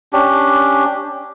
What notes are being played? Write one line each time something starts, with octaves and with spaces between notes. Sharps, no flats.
C#4 D4 G4